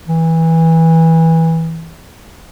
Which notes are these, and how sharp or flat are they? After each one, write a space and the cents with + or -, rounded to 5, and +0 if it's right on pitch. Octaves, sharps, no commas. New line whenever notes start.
E3 -15